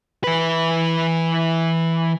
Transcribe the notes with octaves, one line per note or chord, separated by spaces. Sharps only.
E3 B4